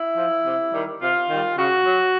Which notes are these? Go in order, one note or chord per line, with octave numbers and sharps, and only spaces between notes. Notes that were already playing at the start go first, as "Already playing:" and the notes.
Already playing: E4
F3
C3
D#3 G3
C3 F4
D#3 G3
C#3 F#4
F#3